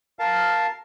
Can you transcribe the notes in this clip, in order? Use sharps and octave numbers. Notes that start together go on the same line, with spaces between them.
A#4 F5 A5